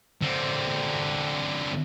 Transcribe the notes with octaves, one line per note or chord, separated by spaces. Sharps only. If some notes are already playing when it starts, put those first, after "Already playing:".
D3 C4